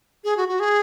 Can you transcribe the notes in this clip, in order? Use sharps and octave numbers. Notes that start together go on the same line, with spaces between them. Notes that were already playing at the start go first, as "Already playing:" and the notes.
G#4
F#4
F#4
G#4